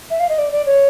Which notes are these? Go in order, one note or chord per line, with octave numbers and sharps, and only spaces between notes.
E5
F5
D#5
D5
D5
C#5